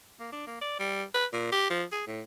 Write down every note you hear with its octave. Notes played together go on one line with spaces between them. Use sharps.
A#3
D4
A#3
D5
G3
B4
A#2
G4
F3
G#4
A2